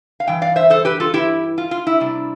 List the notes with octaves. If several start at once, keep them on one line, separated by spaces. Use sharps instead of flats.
F5
G2 E3 G5
D5 F5
C5 E5
A4 C5
G4 B4
F4 A4
E4 G4
F4
F4
E4
C3 G3 D4